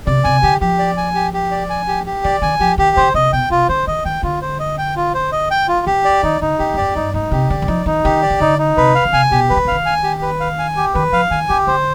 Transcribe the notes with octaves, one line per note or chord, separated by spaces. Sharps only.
C3 D5
C3 G#5
D3 G4
F3 G4
D5
G#5
G4
G4
D5
G#5
G4
G4
D#3 D5
D#3 G#5
F3 G4
D#3 G4
D3 C5
C3 D#5
B2 G5
C3 F4
D3 C5
D#3 D#5
D#3 G5
D3 F4
C5
D#5
G5
F4
C5
D#5
G5
F4
D#3 G4
D5
D#3 D#4
D3 D#4
D3 G4
G2
F2 D5
G2 D#4
G#2 D#4
C3 G4
D3 D5
D#3
F3 D#4
D#3 D#4
D#3 G4
D5
D#3
D3 D#4
D#4
C3 B4
F5
D3
C3 G#5
B2 G4
F3 B4
D#3
D3
D#3 F5
G#5
G4
B4
F5
G#5
G4
D#3 B4
F3 F5
D#3 G#5
D3 G4
D3 C5